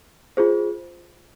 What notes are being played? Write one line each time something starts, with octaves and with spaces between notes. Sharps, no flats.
F4 G#4 C5